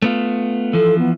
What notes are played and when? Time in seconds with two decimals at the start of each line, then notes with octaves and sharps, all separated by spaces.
0.02 A3 B3 F4
0.73 E3 F3 A4
0.99 B3